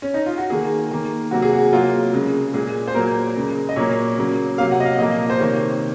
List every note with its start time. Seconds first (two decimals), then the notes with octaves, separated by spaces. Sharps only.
0.02 C#4
0.14 D#4
0.26 F4
0.38 F#4
0.50 D#3 A#3 G#4
0.91 D#3 A#3
1.31 C3 F#3 A#3 F#4
1.42 G#4
1.53 F#4
1.73 C3 F#3 A#3 F4
2.13 C#3 G#3
2.54 A#2 G#3 G#4
2.88 C5
2.94 A#2 F#3 A#3 A#4
3.36 C#3 G#3
3.69 D#5
3.76 A#2 F#3 A#3 C#5
4.18 C#3 F#3 A#3
4.58 C3 F#3 A#3 F5
4.71 F#5
4.80 D#5
4.85 F5
4.99 A#2 F3 A#3 D#5
5.30 C5
5.39 C3 D#3 A#3 C#5